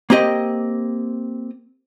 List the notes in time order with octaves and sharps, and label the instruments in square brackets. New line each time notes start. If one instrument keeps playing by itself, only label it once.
[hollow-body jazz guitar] A#3 C4 G4 D#5